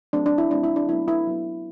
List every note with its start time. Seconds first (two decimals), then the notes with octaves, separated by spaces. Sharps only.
0.13 F#3 A3 C4 D4
0.26 D4
0.38 E4
0.51 F#3 A3 C4 D4
0.64 E4
0.76 D4
0.89 F#3 B3 E4
1.08 E4
1.27 F#3 B3